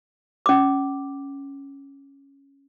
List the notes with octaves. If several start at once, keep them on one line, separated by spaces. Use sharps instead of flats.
C#4 D6